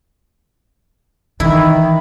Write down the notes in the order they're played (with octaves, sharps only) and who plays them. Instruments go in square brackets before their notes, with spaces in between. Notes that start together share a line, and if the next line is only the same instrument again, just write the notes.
[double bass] D#3 [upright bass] E3 [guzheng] E4